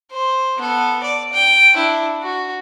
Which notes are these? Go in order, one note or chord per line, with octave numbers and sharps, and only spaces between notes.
C5
B3 A4
D5
G5
D4 E4
F#4